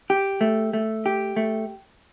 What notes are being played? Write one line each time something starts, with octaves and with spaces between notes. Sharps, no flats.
G4
A3
A3
G4
A3